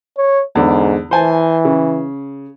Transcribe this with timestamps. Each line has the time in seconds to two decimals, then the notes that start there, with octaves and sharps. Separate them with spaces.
0.17 C#5
0.56 E2 G#2 D3
1.11 E3 C5 G#5 A5
1.65 C#3